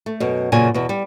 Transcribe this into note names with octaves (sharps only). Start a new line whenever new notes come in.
A3
F#2 B2
F#2 A#2 C#3 G#5
E2 B2
G3